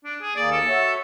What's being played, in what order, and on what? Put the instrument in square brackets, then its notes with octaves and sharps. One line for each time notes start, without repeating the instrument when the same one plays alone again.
[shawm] D4
G#4
[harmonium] D#2 A#3 G#4 [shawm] D5
[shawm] A4
[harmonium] F#4 C#5 E5